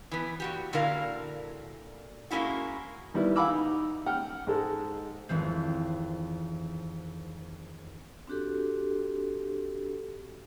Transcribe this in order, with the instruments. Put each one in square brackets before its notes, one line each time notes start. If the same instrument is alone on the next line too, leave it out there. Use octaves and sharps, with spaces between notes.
[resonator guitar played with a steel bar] E3 B3
A#2 F#4 G4
A#2 D3 E4 F#4 A#4 F5
G#3 A#3 C4 C#4 E4 F#4
[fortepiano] D#3 G3 B3 E4
F5 F#5 G#5 B5 D6 E6
D#4
F#5 G5 F6
G#2 G#3 A4
[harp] G#1 F2 E3 C4
[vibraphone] C4 D4 F#4 G4 A4